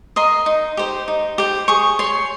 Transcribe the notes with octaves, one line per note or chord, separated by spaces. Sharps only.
A#4 D#5 C6
D#4
G4 C5
D#4
G4 C5
G#4 C#6
C#5 C6